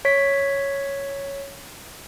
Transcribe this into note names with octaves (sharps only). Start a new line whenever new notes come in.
C#5 B6